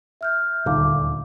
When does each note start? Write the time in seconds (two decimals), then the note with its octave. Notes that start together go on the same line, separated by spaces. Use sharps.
0.21 E5 F6 G6
0.66 D#1 D2 A#2 D3 D#4 F5 D6